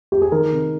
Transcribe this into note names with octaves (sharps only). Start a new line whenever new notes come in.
G4
G#4
D#3 A#4
C3